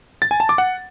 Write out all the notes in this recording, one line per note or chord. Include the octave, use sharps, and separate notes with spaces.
A6
G#5
A5
D6
F#5